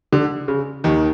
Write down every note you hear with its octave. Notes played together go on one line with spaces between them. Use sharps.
D3
C#3
D#2 D#3